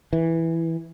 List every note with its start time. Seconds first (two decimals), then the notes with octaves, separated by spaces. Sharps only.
0.13 E3